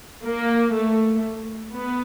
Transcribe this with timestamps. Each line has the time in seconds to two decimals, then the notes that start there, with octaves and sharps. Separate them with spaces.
0.21 A#3
0.72 A3
1.74 B3